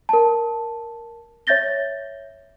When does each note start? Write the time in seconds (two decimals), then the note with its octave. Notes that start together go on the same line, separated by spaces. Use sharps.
0.09 A#4 A5
1.47 C#5 E5 G6 A6 A#6 G7